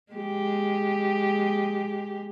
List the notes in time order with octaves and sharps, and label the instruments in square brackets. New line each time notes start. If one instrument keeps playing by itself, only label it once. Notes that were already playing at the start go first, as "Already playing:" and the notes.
[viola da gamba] G#3 G4